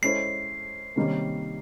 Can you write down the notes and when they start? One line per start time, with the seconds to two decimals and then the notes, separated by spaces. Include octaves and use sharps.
0.02 G#3 C#4 E4 A4 C5 C7
0.96 C3 D#3 G3 A#3 C#4